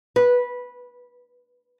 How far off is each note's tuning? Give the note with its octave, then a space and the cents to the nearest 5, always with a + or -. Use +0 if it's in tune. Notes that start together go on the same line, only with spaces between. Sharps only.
B4 -15